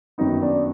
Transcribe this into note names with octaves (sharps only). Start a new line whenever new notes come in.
F#2 D#3 F#3 B3 D#4
D4